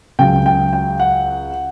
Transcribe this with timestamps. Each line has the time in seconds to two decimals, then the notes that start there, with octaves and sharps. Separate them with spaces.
0.19 C#2 C#3 F#3 G5
0.46 G5
0.73 G5
1.00 F#5